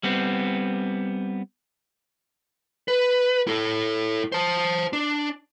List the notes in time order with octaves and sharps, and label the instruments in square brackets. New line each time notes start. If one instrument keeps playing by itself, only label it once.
[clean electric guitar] G3 B3 C4
[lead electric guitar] B4
E4 A4
C5 A5
D4